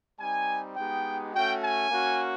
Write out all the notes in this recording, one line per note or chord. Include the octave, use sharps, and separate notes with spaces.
G3 C4 D#4 G#5
G#3 B3 D#4 G4 G5
A3 C#4 F#4 G5
G#5
A#3 C#4 F#4